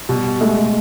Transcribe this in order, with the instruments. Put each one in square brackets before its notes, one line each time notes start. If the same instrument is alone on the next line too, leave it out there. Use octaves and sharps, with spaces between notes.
[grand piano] B2 [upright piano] G3
[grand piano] G#3 [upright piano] A3